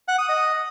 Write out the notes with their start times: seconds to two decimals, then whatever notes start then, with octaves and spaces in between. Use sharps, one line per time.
0.08 F#5
0.19 D#6
0.29 D#5